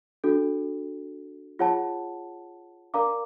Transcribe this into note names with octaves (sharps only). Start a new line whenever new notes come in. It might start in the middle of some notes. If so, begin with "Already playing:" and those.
D4 F#4 A4
F4 G#4 C#5 F#5 A5
A#4 D5 F5 A#5 D6